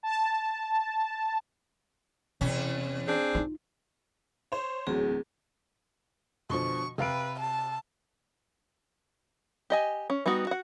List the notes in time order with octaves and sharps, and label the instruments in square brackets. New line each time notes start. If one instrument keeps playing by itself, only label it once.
[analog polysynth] A5
[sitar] E2 C#4 [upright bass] C3
[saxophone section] C4 D4 G#4
[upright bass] D#4 F4
[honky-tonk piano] C5 C#5
[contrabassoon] D1 [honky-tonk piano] E2 F#3 [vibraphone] G#4
[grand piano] B2 D3 F3 [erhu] C#6
[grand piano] C3 F5 D7 [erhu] B4
[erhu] A5
[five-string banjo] G4 D#5 G#5
C#4
G3 B3 D#4 F#4
F#4 F#5